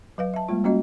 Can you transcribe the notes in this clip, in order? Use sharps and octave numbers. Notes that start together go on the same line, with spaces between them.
F#3 B4 F5
E5 A5
G3 G#3 A#3 F4
G3 A#3 C#4 F#4 D#5